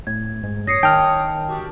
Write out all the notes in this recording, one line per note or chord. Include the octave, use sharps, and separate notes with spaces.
A2 G#6
G#2
G2 C#5 D#6 A#6 C7 C#7
D#3 G5 A5 F6
D4 F#4 G4